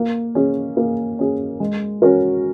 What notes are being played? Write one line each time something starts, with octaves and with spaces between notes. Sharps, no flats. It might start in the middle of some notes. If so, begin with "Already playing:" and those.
Already playing: A#3
C#4 G#4
A#3
C#4 G#4
G#3
C#4 F#4 A#4